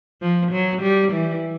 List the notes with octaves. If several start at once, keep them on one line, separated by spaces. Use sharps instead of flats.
F3
F#3
G3
E3